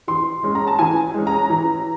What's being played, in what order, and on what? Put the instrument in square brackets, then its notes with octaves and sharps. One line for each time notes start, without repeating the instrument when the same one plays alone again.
[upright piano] E3 C6
G#3 C#4
A#5
A5
E3 G#5
G#3 C#4
A#5
E3